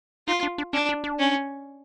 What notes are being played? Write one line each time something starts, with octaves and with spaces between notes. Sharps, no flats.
D#4 F4
D4
D4
C#4 D4
D4
D4
C#4